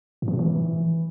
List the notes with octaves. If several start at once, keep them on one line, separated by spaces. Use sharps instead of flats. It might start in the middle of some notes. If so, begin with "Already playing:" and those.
A2
E3
A#2
E3